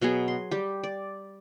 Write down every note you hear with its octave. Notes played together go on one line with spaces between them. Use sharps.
B2 F#3 B3 G#4
C6
G3 G4
D5